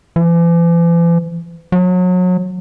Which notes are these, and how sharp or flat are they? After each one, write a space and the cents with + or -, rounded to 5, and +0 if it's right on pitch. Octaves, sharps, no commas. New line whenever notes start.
E3 +45
F#3 -30